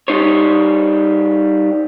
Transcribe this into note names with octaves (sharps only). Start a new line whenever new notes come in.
G3 D#4 C5 C#5